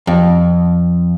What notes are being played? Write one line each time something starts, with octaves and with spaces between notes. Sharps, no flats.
F2